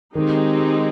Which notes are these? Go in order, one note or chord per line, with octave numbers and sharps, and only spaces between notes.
D#3 G#3 C4 D#4 G4